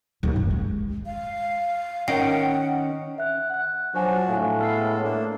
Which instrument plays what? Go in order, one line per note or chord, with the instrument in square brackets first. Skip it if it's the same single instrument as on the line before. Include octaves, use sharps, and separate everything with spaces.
[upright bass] D#2
F#2
G#3
[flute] F5
[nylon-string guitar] D#3 C#4 D#5 [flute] F#5 [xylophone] G5 C7 D7
[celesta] E5 F#6
F#5 F#6
[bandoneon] F3 D4 F#4 [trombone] F#3 [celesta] C5 G#5
[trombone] A2 [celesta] F5 G#5
[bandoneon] G#3 B3 A4 [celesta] F6 C7
[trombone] A3 [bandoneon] A#3 D4